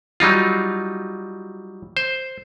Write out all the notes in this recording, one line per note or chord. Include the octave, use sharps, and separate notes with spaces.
F#3 G3 D#4 F4
C5